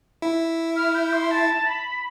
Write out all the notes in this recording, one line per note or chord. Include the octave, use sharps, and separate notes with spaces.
E4
F6
G6
C6
A5
B5